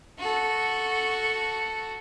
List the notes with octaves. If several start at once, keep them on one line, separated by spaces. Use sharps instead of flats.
F#4 A4